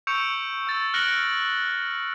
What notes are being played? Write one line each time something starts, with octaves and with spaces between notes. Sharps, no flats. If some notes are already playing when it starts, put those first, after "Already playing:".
C#6 E6 G6 C#7 D7 F7
E6 A6
F6 F#6 A#6 C#7 D7 F#7